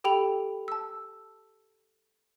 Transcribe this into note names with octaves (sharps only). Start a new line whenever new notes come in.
G4 A4 G5 B5 F7
A5 E6